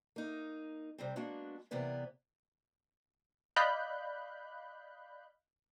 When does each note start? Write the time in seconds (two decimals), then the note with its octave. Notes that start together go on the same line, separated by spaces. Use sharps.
0.16 A#3 D#4
0.98 C3 G3 C4
1.16 G#3 A#3 B3 D4 F#4
1.71 C3 E3 A#3 B3 D5
3.56 D5 D#5 F5 B5 F#6 G6